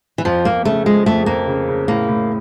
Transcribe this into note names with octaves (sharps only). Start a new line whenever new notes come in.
E3
F2 F3
F2 A#3
C#3 A3
F3 G#3
F2 A3
F2 A#3
C#3
C#3
A2 A#3
A2